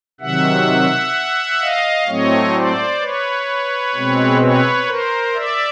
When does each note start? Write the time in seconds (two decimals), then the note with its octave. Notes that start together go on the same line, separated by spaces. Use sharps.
0.21 C3 D#3 F#3 E5 F#5
1.61 D#5 F5
2.07 A2 F#3 A3 C4 C#5 D#5
2.54 C5 D5
3.00 B4 C#5
3.95 B2 G#3 C4
4.41 B4 C#5
4.88 A#4 C5
5.34 D5 E5